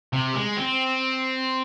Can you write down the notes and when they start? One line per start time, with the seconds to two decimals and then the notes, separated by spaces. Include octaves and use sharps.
0.13 C3
0.35 G#3
0.57 C4